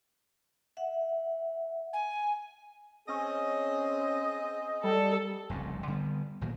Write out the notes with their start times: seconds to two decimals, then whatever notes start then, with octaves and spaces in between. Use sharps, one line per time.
0.77 E5 F#5
1.93 G#5
3.09 C4 C#4 G#4 D#5
4.84 G3 A4
5.49 F1 C2 G#2 C#3
5.88 D3 G3 B3
6.41 G#1 A#2 D#3 F#3